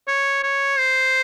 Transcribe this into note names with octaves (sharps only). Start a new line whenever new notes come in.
C#5
C#5
C5